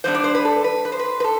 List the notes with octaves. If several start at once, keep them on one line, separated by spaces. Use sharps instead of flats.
G2 D3 G3 B3 D4 C5
D5
C5
B4
A4
B4
B4
C5
B4
B4
A4